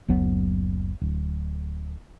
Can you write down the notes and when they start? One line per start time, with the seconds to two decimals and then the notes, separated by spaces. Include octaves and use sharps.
0.08 F#1 D2 F#3 B3
1.01 D1